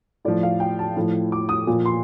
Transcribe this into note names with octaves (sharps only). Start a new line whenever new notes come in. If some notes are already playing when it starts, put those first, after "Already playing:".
A2 F3 D5
F5
G5
A5
A2 F3
D6
D#6
A#2 F3
C6